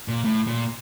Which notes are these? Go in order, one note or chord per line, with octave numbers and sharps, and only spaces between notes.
A#2
A2
A#2